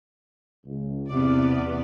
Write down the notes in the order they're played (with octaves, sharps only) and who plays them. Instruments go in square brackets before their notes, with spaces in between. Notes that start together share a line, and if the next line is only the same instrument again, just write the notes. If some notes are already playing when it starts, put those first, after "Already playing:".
[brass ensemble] C#2
[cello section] E2 B3 D5 [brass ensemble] C3